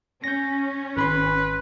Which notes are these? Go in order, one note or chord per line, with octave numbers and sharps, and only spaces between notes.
C#4 G6 A#6
G#1 B4 B5 C6